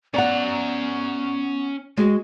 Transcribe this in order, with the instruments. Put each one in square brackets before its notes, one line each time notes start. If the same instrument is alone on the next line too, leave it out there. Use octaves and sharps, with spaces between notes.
[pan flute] B3 [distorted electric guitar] C#4 A#5 [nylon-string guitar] D5 F#5
[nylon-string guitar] G#3 G#4 [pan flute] F#4